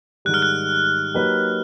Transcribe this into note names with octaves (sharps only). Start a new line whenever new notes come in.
G#2 D#3 G3 F#6
F6
F#6
F#3 A#3 D#4 G4 B4